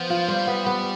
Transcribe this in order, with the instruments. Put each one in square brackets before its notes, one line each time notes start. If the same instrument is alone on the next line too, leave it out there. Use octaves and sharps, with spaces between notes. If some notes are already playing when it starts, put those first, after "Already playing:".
Already playing: [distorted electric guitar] F3 [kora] B3
[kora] F4
[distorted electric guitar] G3 [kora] C5
[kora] B3
B3